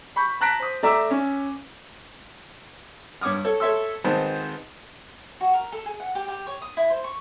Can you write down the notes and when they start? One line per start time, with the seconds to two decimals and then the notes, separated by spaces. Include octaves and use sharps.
0.16 B5 C#6 G6
0.41 A5 A#5 F#6 A#6 B6 D7
0.59 C5 D#6
0.83 A3 D5 E5 A#5 D6 E6
1.11 C#4
3.21 G2 C#5 D6 D#6 F6
3.44 A4 C#5
3.60 A4 C#5 E5 C6 E6
4.04 G#1 D#3 B4 C5 D#5 A5
5.41 F#4
5.53 A#4
5.72 A4
5.86 G#4
6.00 F#5
6.15 G4
6.28 G4
6.47 C#5
6.62 D#6
6.77 E4
6.90 C5
7.04 C#6